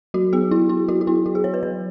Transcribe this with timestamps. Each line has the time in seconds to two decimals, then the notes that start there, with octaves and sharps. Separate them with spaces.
0.14 F#3 F#4
0.33 B3 G#4
0.51 F#3 E4
0.69 B3 E4
0.89 F#3 F#4
1.01 F#4
1.07 B3 E4
1.26 F#3 F#4
1.35 G#4
1.44 B3 C#5
1.54 B4
1.63 F#3 C#5